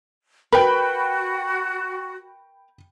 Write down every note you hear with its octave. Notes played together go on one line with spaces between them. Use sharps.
F#4 A#4 B4 G5 B5